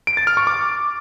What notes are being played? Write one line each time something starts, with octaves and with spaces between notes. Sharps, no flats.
D7
A6
F6
C#6
D6